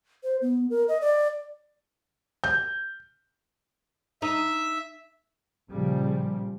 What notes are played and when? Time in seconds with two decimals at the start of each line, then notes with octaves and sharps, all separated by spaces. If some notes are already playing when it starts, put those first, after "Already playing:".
0.24 C5
0.42 B3
0.70 A#4
0.88 D#5
1.01 D5
2.44 G6
4.22 D#4 E5
5.70 A#2 C#3 F3 G3